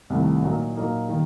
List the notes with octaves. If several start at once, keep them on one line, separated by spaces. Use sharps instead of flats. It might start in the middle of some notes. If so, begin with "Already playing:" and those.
C2 C3 D#3 A3
A#2 F#3 A#3 D#4
A#2 F#3 A#3 D#4
D#3 G3